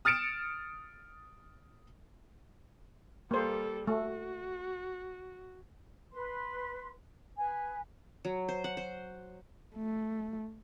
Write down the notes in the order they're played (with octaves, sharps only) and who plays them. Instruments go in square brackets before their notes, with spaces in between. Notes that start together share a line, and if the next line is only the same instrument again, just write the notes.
[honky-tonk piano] D#6 F6 A6 C#7 D7 E7
[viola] G3 A4 [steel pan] A#3 C5
[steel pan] A3 [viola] F#4
[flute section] B4 C6
B4 G#5
[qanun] F#3
C5
F#5
C5
[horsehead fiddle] A3